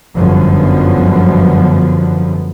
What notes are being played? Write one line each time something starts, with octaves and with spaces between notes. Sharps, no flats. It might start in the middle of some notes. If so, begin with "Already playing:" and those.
G1 F#2 D3 F3 B3